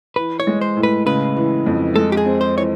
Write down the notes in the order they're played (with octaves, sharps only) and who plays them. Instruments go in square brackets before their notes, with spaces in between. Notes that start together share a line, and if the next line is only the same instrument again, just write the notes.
[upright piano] E3 [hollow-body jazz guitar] B4
[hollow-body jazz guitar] C#5
[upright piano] G#3
[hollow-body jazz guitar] C5
[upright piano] A2
[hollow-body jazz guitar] B4
[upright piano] C#3 [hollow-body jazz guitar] B4
[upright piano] E3
F2
[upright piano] G#3 [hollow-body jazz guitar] A4
[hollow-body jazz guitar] G4
G#4
[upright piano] C4
[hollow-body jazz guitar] C5
[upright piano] E3 [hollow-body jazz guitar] C#5